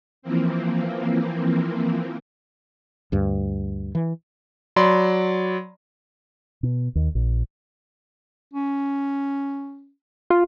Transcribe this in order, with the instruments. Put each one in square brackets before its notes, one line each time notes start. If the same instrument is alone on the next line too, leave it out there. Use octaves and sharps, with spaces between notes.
[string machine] E3 F3 A#3 C4
[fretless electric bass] D2 G2
E3
[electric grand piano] F#3 D5 B5 C6
[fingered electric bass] B2
D#2
A#1
[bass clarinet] C#4
[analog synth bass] F4